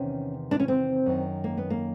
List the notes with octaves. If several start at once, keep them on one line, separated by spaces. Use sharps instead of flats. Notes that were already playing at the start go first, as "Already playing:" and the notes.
Already playing: E2 C3 D#3 C#4
D4
C#4
C4
F#2 D#3
A#3
B3
A#3